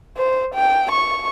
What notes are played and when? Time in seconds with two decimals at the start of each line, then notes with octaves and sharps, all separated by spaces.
0.17 C5
0.54 G5
0.91 C#6